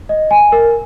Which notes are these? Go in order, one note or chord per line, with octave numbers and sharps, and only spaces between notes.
D#5
G#5
A#4